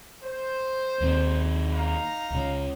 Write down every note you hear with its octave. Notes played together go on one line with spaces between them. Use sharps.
C5
D#2 G3 C4
D#4 F5 A#5
C#2 C#3